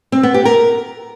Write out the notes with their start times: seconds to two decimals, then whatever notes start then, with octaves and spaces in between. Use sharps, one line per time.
0.12 C4
0.23 B3
0.34 G4
0.45 A#4